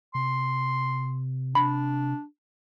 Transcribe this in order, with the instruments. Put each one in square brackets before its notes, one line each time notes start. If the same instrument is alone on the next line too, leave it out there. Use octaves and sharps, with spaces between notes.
[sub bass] C3 [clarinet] C6
[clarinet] D4 [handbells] B5